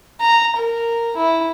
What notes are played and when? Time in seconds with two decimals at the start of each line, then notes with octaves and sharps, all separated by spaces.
0.21 A#5
0.56 A#4
1.16 E4